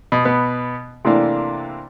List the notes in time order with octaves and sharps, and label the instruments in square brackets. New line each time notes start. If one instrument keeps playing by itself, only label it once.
[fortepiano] B2
B2 B3
C3 E3 A3 A#3 D4